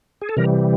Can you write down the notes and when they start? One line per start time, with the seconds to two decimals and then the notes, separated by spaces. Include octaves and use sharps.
0.21 G#4
0.29 A4
0.37 C3 E3 G3 A#4